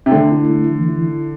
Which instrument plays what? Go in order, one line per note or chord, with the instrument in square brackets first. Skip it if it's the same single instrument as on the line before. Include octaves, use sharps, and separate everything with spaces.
[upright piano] C3
[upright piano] D3 [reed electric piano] A3
[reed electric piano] E4
A3
E3
E4
E4